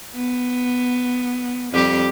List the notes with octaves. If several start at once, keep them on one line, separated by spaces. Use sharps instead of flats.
B3
F2 G3 G4